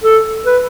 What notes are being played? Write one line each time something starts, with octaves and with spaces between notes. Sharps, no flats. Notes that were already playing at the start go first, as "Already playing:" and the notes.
A4
B4